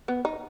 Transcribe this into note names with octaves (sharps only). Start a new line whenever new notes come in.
B3
D#4